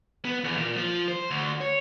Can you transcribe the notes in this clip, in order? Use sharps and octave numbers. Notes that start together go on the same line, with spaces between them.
B3
E2
A#2
F3
C5
D2
C#5